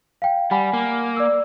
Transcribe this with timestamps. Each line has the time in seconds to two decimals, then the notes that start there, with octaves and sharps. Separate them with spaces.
0.22 F5 G5
0.51 G3 F#5 G#5 B5
0.73 A#3
1.17 D5 D6 E6